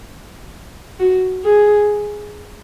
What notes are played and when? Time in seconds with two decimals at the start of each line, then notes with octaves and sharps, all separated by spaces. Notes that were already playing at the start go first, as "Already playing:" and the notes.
0.99 F#4
1.44 G#4